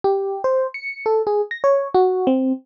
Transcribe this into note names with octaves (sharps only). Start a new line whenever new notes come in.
G4
C5
C#7
A4
G#4
A#6
C#5
F#4
C4